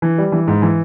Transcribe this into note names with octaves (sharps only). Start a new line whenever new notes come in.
E3
G3
E3
G#2
E3